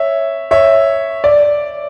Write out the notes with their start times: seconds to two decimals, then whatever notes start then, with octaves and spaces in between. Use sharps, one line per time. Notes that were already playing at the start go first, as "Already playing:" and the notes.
Already playing: C#5 E5
0.51 C#5 E5
1.24 D5